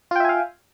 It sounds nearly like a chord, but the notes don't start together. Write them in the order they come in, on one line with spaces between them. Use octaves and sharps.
F4 G5 E5 G#5 F5